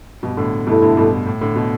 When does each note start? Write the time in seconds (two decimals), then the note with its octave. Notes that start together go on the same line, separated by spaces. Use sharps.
0.23 G2 B2
0.37 A2 D3
0.67 G2 B2 A3 E4 A4
0.82 A2 D3
0.97 G2 B2
1.27 A2
1.41 A2 D3
1.56 B2